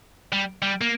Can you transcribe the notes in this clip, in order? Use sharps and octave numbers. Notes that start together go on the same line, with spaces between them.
G3
G3
A#3